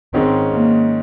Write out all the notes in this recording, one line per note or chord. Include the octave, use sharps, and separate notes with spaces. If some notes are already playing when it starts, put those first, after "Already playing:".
G#2 D#3 G#3 C4 C#4
A#3